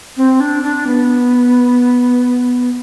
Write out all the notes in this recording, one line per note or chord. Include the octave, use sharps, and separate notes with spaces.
C4
D4
D4
B3